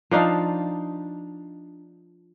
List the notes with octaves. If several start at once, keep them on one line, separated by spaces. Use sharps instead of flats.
F3 D4 D#4 F5